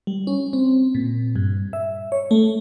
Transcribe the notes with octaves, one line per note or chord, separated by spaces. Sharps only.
G3
C#4
C4
A#2
G2
E5
C#5
A3